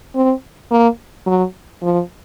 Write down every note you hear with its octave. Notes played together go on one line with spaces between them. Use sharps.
C4
A#3
F#3
F3